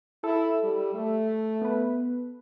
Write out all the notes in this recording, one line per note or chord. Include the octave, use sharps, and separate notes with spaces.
E4 A4 E6
G3
A3
B3 B4